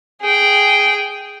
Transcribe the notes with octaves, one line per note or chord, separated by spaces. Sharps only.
G#4 G5